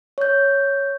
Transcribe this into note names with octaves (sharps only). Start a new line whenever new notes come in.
C#5 G6